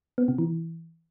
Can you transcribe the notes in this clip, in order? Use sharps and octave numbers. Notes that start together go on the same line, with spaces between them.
B3
C3
E3